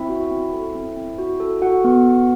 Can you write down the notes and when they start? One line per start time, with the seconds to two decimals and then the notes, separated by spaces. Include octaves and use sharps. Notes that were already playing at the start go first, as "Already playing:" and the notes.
Already playing: C4 E4 E5
0.09 F#4
0.31 C4
0.53 A4
0.75 C4
0.97 C4
1.18 F#4
1.40 A4
1.62 F#4 A4 F#5
1.84 B3
2.05 B3